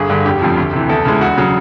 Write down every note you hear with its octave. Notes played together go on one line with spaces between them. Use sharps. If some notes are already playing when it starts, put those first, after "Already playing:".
Already playing: G1 G#4
G2 D3
F1 G4
F2 C#3 F3
D2
C3 E3
E2 A4
C#3 E3 G#3
E1 F#4
C#3 F#3